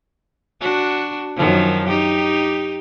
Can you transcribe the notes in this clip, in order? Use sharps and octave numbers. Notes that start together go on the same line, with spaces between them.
D4 F#4
F#2 D#3 F3
D#4 G4